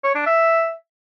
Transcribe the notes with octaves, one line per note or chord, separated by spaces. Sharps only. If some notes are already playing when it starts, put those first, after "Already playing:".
C#5
D4
E5